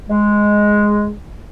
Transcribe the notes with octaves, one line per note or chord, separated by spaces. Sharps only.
G#3